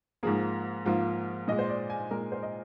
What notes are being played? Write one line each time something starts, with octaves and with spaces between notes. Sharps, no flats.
G#2 F3 A#3 G#4
G#2 F3 A#3 F4
A#2 G#3 D#5
C5
D5
G#5
A#2 G#3 A#4
C5
D#5